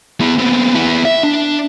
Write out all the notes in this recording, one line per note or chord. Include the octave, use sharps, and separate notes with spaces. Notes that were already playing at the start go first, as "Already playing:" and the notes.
B3 E4
B3 C4
B3 E4
E5
D4